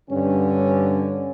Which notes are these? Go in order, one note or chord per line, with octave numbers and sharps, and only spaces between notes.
G2 D3 C#4